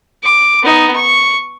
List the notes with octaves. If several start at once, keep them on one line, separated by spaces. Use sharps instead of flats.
D6
B3 D#4
C#6